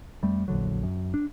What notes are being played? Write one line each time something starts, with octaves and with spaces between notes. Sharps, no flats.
F2 G3 A3
A#1 E2 D3 F#3
F#2
D4